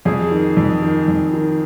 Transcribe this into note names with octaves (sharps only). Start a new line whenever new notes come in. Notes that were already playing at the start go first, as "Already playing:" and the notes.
F2 G#4
D#3
F2
D#3
F2
D#3